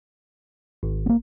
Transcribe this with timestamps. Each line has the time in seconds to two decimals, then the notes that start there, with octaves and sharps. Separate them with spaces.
0.83 G#1
1.06 A#3 B3